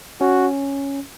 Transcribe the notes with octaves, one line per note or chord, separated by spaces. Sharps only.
C#4 F#4